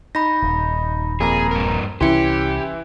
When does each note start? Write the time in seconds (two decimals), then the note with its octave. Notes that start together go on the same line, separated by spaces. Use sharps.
0.15 D#4 B5 A#6
0.42 D#1
1.20 F2 A#3 G#4 A#5
1.51 G2 A#4
2.01 C2 E3 C#4 E4 G4 C6 C#7